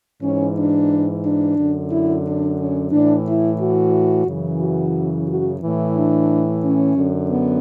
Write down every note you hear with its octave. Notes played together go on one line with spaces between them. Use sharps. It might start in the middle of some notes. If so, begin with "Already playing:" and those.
G#2 E3 C#4
D4
D4
F#2 D3
E4
D4
C#4
A2 E3 D4
E4
F#4
F#2 C#3 E3
F#4
F#4
A2 E3
D4
C#4
F#2 D3
B3